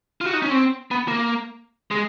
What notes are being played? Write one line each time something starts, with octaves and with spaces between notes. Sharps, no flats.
F4
F#4
D#4
C#4
C4
B3
A#3
G#3